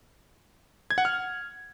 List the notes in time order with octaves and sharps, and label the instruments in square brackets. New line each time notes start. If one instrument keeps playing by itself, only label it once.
[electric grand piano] G#6
F#5
F6